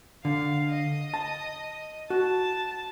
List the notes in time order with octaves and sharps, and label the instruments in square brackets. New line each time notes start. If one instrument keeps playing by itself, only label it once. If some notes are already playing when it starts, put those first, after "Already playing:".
[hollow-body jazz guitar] D3 [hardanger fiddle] F5
[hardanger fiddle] D#5
[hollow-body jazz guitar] A5
[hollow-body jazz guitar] F#4 [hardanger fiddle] A5